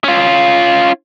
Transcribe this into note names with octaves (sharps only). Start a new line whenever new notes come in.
C#4 F4